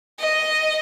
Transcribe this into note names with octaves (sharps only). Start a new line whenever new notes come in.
D#5